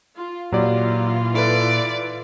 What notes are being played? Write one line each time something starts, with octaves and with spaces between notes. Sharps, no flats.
F4
A#2 E3 F#3 F4 G4 D5
E4 A4 B4 D5